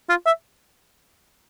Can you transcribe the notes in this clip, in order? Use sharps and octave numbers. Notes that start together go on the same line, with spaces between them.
F4
E5